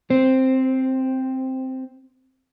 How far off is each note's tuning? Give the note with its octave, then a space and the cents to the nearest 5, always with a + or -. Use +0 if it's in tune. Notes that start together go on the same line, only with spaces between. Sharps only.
C4 +0 C5 +0